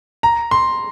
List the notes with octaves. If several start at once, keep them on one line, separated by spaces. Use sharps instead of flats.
A#5
C6